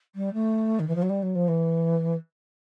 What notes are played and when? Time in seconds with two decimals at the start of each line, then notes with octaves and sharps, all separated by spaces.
0.15 G3
0.33 A3
0.79 D#3
0.87 E3
0.95 F3
1.02 F#3
1.09 G3
1.22 F#3
1.35 F3
1.48 E3